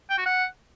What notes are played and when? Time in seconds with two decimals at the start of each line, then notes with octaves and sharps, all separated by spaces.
0.10 G5
0.18 F#4
0.26 F#5